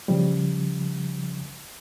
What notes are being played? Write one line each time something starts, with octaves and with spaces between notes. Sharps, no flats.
C#3 F3 G3